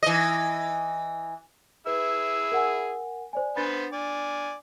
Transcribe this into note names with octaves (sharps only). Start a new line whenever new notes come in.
E3 D#5
E4 G#4 B4 E6
A#4 F#5 G#5
C5 D5 G#5
B3 D4 B4 C5 A6
D5 G#5